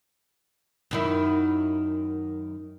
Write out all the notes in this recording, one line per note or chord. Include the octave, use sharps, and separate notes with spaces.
F#2 D#3 E4